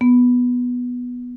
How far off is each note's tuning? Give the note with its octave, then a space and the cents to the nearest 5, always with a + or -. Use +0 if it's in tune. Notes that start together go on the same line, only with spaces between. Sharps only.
B3 -5